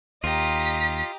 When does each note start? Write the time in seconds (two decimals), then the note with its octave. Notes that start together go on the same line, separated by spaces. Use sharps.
0.24 D#2 F4 G4 D#5 A#5 B6